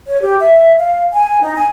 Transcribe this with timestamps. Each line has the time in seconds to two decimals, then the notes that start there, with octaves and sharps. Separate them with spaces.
0.07 C#5
0.21 G4
0.39 E5
0.79 F5
1.13 G#5
1.41 D#4
1.56 G#5